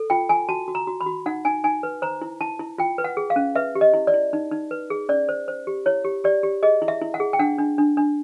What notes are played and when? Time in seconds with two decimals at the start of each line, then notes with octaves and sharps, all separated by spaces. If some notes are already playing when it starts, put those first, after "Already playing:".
Already playing: A4
0.10 F4 G5
0.29 F4 G#5
0.49 F#4 A5
0.68 F#4
0.75 A#5
0.87 F#4
1.01 B5
1.06 F#4
1.26 D#4 F#5
1.45 D#4 G#5
1.64 D#4 G#5
1.83 B4
2.02 C5 A#5
2.22 E4
2.41 E4 A5
2.60 E4
2.78 F4 G5
2.98 B4
3.04 F#5
3.17 G#4
3.30 F5
3.36 C#4
3.55 B4 E5
3.75 G4
3.81 D#5
3.94 E4
4.07 D5
4.14 E4
4.33 D#4
4.51 D#4
4.71 B4
4.90 G#4
5.09 C#4 D5
5.29 C5
5.48 C5
5.67 G4
5.86 E4 C#5
6.05 G4
6.24 G4 D5
6.43 G4
6.63 G#4 D#5
6.82 E4
6.88 E5
7.01 E4
7.14 F#5
7.20 G#4
7.33 G5
7.39 D4 F#5
7.58 D4
7.78 D4
7.97 D4